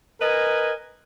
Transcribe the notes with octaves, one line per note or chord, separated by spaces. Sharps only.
A#4 B4 D#5 G#5